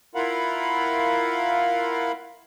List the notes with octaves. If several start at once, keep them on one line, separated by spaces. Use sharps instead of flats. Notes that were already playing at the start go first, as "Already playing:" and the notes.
E4 F4 A#4 F5 F#5 B5